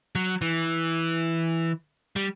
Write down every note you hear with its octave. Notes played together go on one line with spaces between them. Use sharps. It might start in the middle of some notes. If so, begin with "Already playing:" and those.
F#3
E3
G3